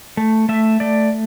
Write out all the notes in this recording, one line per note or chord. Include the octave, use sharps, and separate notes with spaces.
A3
A3 E5
A3 D5